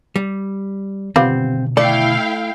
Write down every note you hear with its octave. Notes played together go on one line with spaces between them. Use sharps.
G3
B2 D3 D#3 G3 B3 C4 F4
A3 E4 A4 D5 F5 G5